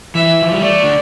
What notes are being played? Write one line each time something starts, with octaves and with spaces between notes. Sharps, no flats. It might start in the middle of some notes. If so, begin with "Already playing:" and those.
E3 E5
F3
G3
A3 D5
D3